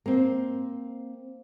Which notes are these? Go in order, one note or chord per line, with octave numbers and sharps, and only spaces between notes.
A#3 C4